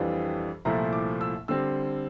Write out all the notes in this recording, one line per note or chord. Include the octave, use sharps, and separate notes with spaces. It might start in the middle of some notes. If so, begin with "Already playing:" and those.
Already playing: F2 E3 G3 D4 F4 G5
C2 A#2 F3 A3 E4 A#5
D6
E6
D3 G3 C4 E6